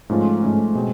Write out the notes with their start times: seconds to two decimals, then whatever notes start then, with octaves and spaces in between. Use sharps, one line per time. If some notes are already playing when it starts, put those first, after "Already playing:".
0.09 G#2 F3 A3 C#4 F4
0.42 G#2 F3 A3 C#4 F4
0.75 B2 G#3 C4